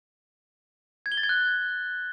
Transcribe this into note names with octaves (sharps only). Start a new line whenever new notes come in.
G#6
G7
A6
G#6
F#6